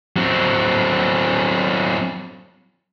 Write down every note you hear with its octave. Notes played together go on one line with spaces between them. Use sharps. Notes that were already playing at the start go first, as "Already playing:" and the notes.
F#3 C4